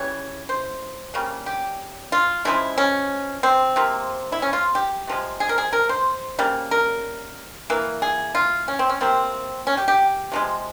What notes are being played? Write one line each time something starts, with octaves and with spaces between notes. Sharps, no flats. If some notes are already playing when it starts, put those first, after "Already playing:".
Already playing: C#3 E3 G3 C#5
C5
C#3 G3 A#3
G4
F4
C#3 F3 G#3 E4
C#4
C4
C3 F3 A#3
E4
C#4
F4
G4
C3 F3 G#3
G#4
A#4
G#4
A#4
C5
C#3 G3 A#3
A#4
E3 A#3
G#4
F4
C#4
C4
C#4
C3 G3 A#3 C4
C#4
G4
G4
C3 F3 G#3